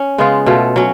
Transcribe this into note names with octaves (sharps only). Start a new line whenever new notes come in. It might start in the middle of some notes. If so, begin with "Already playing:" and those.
Already playing: C#4
C#3 G#3 B3 F4
B2 A3 F4
F#3 C#4